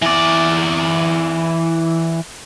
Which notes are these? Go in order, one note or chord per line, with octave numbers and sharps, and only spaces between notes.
E3 D5